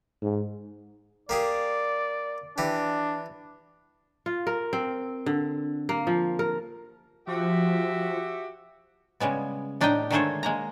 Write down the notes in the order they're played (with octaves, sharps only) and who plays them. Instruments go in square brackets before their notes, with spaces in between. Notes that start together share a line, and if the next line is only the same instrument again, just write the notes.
[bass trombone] G#2
[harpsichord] A#3 G4 G#4 [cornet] D5
[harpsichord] E3 G4 [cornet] D4
[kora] F4
A#4
C4
D3
A#3
F3
A#4
[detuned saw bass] F3 [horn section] F#4 G4 E5
[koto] C#3 G3 G#3 B3
A2 D4 D#4 G4 D#5 G5
D3 D#3 G#3 A3 C5 C#5
G#3 A#3 A#5